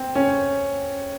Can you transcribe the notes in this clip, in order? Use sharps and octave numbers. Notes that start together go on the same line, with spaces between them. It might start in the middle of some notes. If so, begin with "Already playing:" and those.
Already playing: C4
C#4